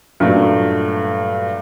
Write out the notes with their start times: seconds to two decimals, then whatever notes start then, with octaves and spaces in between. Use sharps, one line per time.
0.20 G2 A#2 F#3 A3